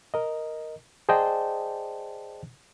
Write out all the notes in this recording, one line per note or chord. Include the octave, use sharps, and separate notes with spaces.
A#4 D#5
G#4 C5 D5 D#5 G5 A5